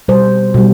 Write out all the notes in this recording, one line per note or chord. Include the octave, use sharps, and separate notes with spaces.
B2 G3 C5
B2 G3